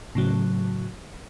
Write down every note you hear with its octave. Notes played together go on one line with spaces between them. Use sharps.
A2 C#3 F#3